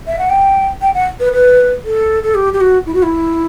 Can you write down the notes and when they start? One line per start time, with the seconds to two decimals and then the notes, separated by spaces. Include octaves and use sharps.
0.07 E5
0.19 F#5
0.30 G5
0.82 G5
0.94 F#5
1.20 B4
1.33 B4
1.84 A4
2.23 A4
2.35 G4
2.53 G4
2.61 F#4
2.86 E4
2.94 F#4
3.03 E4